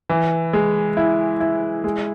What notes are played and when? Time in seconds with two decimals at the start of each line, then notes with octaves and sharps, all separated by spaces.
0.09 E3
0.53 G#3
0.97 E4
1.40 E4
1.84 G#3